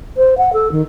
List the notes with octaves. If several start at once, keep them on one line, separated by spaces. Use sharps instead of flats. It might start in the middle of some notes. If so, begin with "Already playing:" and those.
C5
F#5
A4
D#3